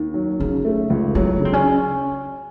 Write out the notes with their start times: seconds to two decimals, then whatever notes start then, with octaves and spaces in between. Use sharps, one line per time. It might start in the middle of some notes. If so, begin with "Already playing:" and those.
Already playing: D#2
0.14 F#3
0.39 C#3 D#4
0.65 A3
0.90 C#2
1.15 F#3 E4
1.40 C#3 C4
1.53 C#4